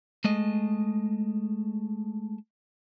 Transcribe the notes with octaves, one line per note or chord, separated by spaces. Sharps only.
G#3 A3 D#5